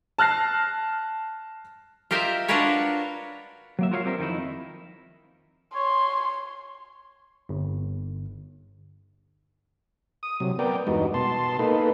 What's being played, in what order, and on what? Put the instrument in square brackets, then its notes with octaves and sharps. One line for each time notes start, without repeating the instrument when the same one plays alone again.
[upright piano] A5 F6 F#6 A#6 C7
[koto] F4 G4 A#4 C5 D#5 E5
D4 F4 F#4 A#4 B4 C#5
[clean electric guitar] F#3 A#3 E5
F4 F#4 A#4 C#5 D5 F5
G3 C4 A#4 E5
F2 D#3 D#4 E4
[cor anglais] C#5 [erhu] C6
[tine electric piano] G1
[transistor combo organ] D#6
C3 F#3
B3 A#4 D5 G5
E2 G2 G#3 B3 D#4 F#4
B2 A5 C6
A#3 D#4 A4 B4